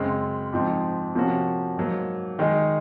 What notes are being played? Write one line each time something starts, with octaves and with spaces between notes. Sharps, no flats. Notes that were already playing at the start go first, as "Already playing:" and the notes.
Already playing: F#2 C#3 G#3 C4
G#2 F3 C4 D#4
C3 F3 A#3 C#4 F#4
G#2 F#3 A#3
D#3 G#3 D#4 G#4 D#5